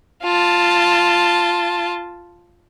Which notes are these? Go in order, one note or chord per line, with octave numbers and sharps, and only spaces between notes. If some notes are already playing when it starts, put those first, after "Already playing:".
F4 A5